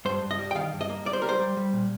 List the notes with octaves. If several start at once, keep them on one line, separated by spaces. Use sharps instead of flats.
G2 C5
G2
D#5
G3
G5
D#3 F5
G2
D#5
A#3
G3 D5
C5
G3 A#4
C5
G3
G3
A#2